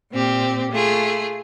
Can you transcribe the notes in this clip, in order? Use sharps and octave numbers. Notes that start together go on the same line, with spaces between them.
A#2 C4 G4
A3 F4 G#4